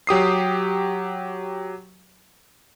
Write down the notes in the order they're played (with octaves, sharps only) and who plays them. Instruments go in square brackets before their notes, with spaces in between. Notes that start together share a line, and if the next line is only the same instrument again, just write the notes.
[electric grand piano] F#3 G4 D#6 C7